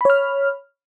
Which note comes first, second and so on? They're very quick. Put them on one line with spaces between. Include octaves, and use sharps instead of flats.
B5 C#5 F6